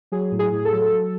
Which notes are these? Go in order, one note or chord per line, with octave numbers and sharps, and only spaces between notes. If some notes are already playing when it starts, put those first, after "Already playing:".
F#3 G#4
A2
G#4
A2
A4
F#3
F#3